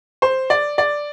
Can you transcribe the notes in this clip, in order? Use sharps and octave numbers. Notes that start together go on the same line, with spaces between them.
C5
D5
D5